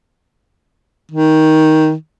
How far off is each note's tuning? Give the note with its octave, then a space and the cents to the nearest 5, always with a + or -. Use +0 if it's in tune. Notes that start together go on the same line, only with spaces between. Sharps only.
D#3 +10